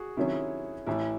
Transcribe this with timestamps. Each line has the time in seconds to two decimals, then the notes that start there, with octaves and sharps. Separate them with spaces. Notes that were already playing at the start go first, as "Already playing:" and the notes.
Already playing: F#4 G#4
0.17 C3 D#3 F#3 C#4 E4
0.86 A1 A2 E3 E4